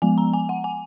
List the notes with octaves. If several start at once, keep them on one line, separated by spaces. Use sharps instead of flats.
F3 G#3 B3 G#5
A#5
G#5
F#5
G#5